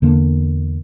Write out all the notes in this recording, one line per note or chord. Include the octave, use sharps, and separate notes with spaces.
E2 D3 A#3